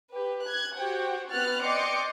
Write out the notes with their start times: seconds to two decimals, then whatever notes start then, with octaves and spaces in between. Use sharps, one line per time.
0.14 G4 B4
0.46 F#6 G#6
0.76 F#4 G4 C5 F#5 G5
1.32 B3 C4 B4 F6 F#6 A6
1.62 D5 D#5 G5 C6 D6 C#7